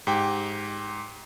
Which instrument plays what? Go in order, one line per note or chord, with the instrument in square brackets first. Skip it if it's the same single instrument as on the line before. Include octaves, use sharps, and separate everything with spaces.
[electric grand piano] G#2 G4 G5